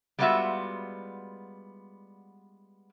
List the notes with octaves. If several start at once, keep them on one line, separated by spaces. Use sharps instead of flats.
G3 G#3 B3 F4 F#4 E5